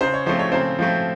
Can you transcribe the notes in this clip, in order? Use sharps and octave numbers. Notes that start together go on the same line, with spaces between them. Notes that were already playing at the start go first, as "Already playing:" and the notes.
C#3 C5
C#5
F3 A3 C4 C5
C#5
C#3 C4 C5
F3 A3 C4